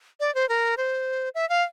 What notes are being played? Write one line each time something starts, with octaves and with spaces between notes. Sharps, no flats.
D5
C5
A#4
C5
E5
F5